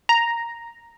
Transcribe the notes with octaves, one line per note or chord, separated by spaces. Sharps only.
A#5